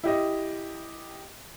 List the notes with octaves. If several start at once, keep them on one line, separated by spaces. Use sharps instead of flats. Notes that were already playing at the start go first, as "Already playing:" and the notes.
E4 G4 D#5